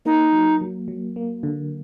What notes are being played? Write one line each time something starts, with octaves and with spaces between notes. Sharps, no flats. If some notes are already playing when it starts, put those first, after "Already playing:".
A#3 D#4
F#3
F#3
F#3
A#3
D3